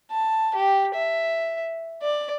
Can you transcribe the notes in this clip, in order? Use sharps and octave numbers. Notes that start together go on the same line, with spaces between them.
A5
G4
E5
D5